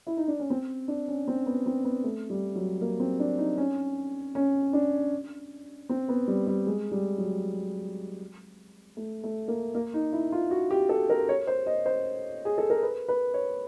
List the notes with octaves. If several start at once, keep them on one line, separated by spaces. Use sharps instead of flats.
E4
D#4
D4
C#4
C4
D4
C#4
C4
B3
C4
B3
A3
G3
F#3
A#3
C4
D4
D#4
C#4
C#4
D4
C4
B3
G3
G3
G#3
G3
F#3
A3
A3
A#3
A#3
D#4
E4
F4
F#4
G4
A4
A#4
C#5
C5
D#5
C5
G#4
A4
A#4
B4
B4
C#5